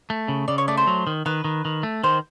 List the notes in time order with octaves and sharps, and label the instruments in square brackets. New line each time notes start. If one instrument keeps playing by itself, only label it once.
[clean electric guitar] A3
C#3
[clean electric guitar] C#3 [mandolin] D5
[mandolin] C#5
[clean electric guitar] A3 [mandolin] D5
[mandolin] C5
[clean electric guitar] F#3
D#3
[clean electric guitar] D#3 [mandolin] B4
[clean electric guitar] D#3
D#3
A3
[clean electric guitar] D#3 [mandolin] C5